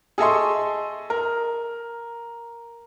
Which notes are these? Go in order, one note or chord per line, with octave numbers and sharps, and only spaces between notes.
G#4 A4 D#5 E5 C6 C#6
A#4